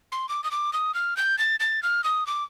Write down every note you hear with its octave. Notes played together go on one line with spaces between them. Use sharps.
C6
D6
D#6
D6
D#6
F6
G6
A6
A6
F6
D#6
D6